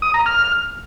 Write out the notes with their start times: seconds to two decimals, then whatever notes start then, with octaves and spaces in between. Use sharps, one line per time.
0.02 D#6
0.14 A#5
0.26 F6